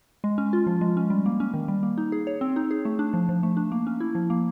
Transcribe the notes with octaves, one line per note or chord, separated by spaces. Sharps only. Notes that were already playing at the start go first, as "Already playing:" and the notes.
G#3
C#4
F4
F3
G#3
C#4
G3
A#3
C#4
D#3
G3
A#3
D#4
G#4
C#5
C4
D#4
G#4
A3
D4
F3
F3
A3
D4
A#3
C#4
E4
F3
A#3